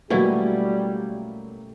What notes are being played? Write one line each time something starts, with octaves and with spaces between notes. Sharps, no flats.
B2 F#3 G3 A3 A#3 C#4 E4